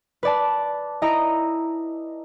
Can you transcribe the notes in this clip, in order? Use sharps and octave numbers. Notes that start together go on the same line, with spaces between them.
B4 D5 A5
E4 D#5 A#5 D7